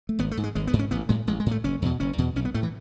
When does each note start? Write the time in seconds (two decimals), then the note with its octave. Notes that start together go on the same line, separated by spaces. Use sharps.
0.09 A3
0.19 G#1 B3
0.31 A3
0.37 G#2
0.43 G#3
0.55 G#1 G#3
0.67 B3
0.73 G#2
0.79 C#4
0.91 A1 B3
1.09 A2 G#3
1.27 A1 G#3
1.40 G#3
1.46 A2
1.51 A3
1.64 F#1 C#4
1.82 E2 B2
2.00 F#1 C#4
2.18 E2 B2
2.36 B1 C#4
2.45 B3
2.54 A2 A3
2.63 E3